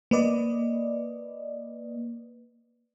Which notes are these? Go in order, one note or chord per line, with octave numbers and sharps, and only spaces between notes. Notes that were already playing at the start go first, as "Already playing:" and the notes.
A#3 B4 D5 D#5